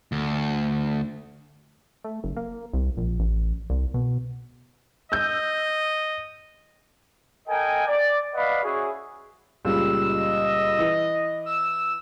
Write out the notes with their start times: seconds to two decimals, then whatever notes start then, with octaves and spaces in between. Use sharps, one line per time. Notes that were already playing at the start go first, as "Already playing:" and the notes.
0.12 D2
2.04 A3
2.24 F#1
2.37 A#3
2.73 C2
2.97 A#1
3.19 A1
3.70 C2
3.94 B2
5.12 D#5 E6 G6
7.48 A4 A#4 D#5 G5 G#5
7.87 D5
8.35 B4 D5 D#5 F5 F#5 B5
8.63 C#4 E4 F#4 G#4
9.65 C#2 A#2 G3 E6
10.10 D#5
10.79 E3
11.46 E6